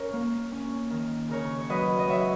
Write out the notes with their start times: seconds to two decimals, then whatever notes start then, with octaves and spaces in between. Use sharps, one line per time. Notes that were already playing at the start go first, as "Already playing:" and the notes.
Already playing: C#4 A#4 C#5
0.13 A#3
0.52 C#4
0.91 D#3
1.29 C#3 A#4 C#5
1.60 C#5
1.69 F#3 B4 D#5
1.99 D#5
2.07 F#3 C#5 E5